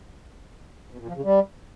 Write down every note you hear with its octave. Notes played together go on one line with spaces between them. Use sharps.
B2
A#2
F3
C#3
G3